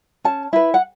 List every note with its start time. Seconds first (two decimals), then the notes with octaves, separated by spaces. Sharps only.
0.24 C#4 A5
0.53 E4 B4
0.74 F#5